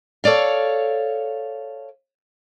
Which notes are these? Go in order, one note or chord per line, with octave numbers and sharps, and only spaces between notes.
A4 C#5 D5 F5